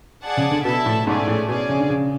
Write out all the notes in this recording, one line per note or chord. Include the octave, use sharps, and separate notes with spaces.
G#4 D5 F#5 A5
C#3
D3
B2 E4 A4 E5 A5
A2
G#2 A3 C#4 G#4 D5
A2
B2 C#4 G#4 D5
C#3
D3
C#3